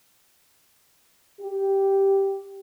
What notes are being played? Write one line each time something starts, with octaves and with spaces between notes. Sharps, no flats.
G4